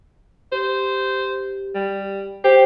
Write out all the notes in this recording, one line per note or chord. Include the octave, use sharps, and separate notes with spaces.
G4 C5
G3
G4 C5 G5